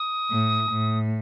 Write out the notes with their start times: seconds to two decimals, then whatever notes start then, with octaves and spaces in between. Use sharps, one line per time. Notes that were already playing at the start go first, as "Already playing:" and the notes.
Already playing: D#6
0.31 A2
0.70 A2